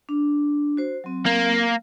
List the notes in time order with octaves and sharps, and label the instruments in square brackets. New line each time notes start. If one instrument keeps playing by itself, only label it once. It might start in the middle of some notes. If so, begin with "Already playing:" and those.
[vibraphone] D4
F#4 C5
F#3 C4
[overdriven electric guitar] A#3